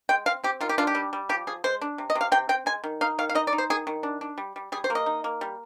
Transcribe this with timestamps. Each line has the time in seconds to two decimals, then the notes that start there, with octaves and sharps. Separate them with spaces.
0.09 G#3 G5
0.26 C4 F5
0.44 C4 G4
0.61 D#3 F4
0.69 G4
0.78 D4 F4
0.87 G4
0.95 G3
1.13 G3
1.29 F3 G4
1.47 F3 G#4
1.64 G#3 C5
1.81 D4
1.98 C3
2.10 D#5
2.15 C3
2.21 F5
2.32 C3 G5
2.49 C4 G5
2.66 G#3 G#5
2.84 D#3
3.01 D#4 F5
3.19 D#3 F5
3.29 F5
3.35 D#4 D#5
3.47 D5
3.53 D#4
3.58 C5
3.70 D#3 G#4
3.87 D#3
4.03 D4
4.21 D4
4.38 G3
4.56 G3
4.72 G3 G#4
4.84 C5
4.90 A#3
4.95 D#5
5.06 D#4
5.24 A#3
5.41 G3